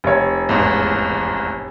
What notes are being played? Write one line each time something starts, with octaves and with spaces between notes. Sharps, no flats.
F1 C#5
A1 E2 G#2